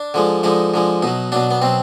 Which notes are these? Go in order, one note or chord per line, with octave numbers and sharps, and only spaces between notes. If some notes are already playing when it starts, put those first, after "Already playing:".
Already playing: D4
D3 F3 G#3
D3 F3 G#3 D#4
D3 F3 G#3
B2 F#3 D#4
B2 F#3 D4
B3
B2 F#3 C4